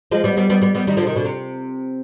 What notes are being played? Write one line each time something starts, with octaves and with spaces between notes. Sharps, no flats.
F3 G#3
G3 B3
G3 B3
G3 B3
G3 B3
G3 B3
D#3 G3
D3 F3
C3 D#3
B2 D3
C3